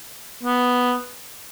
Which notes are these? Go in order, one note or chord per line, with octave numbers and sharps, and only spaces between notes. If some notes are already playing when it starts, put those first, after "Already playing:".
B3